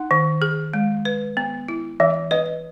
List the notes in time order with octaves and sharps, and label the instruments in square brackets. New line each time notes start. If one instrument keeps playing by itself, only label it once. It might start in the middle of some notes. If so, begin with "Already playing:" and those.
Already playing: [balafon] D#4 [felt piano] F#5
[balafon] D#3
G#4
G#3
B4
B3
E4
[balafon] E3 [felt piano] E5
[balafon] B4 [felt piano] D#5